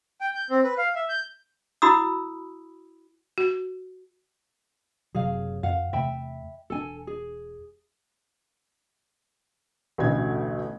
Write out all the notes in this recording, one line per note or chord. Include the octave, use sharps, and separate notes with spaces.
G5
G6
C4
B4
F5
E5
G6
E4 F#4 B5 D#6 E6
F#4
F#1 C3 F#3 G#4 C#5 F5
F2 F5 F#5
E2 C3 A3 E5 G5 B5
E1 C4 D4 A4 G#5
G#4
A1 D2 B2 A3 G#6